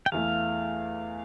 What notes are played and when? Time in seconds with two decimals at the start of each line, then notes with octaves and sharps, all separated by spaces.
0.06 G5
0.12 E2 E3 A3 F5